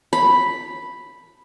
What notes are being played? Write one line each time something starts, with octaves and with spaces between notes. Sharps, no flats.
B5